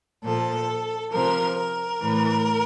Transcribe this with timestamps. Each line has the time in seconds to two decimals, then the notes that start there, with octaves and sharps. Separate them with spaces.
0.23 A#2 F3 A4
1.11 C3 F3 A#4
1.57 A#4
2.01 A2 E3